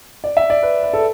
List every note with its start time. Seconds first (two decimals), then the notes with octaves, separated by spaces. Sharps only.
0.24 D5
0.37 E5
0.50 D5
0.63 B4
0.83 B4
0.93 A4